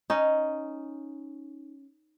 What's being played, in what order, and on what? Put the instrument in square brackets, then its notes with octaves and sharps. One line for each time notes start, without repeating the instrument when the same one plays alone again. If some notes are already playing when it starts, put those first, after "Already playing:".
[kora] C#4 D#4